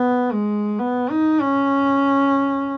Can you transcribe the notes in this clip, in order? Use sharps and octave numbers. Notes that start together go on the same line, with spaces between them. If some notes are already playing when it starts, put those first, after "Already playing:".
Already playing: B3
G#3
B3
D#4
C#4